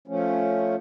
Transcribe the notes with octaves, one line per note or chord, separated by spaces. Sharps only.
F3 A3 C#4